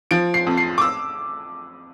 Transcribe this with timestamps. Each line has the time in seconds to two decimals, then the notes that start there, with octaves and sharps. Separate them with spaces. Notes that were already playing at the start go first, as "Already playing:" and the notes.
0.11 F3 D7
0.34 C7
0.47 F2
0.57 C7
0.78 D6
0.81 E6